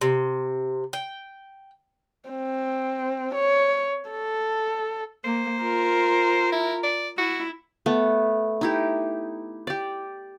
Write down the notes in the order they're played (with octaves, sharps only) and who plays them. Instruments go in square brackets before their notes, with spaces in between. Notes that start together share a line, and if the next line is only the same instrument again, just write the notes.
[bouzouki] C3
G5
[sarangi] C4
C#5
A4
[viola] A#3 [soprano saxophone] C5
[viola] F4 A#4
[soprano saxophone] E4
D5
[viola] E4 [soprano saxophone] F#4
[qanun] A3 B3
D#4 E4 G4
G4 D5